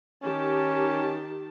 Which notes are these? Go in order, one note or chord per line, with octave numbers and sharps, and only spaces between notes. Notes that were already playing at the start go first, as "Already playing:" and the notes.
D#3 C#4 G4 A5